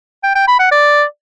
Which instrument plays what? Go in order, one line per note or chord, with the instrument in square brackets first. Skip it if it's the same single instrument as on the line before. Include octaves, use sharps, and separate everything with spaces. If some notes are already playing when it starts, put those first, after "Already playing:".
[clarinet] G5
G5
B5
F#5
D5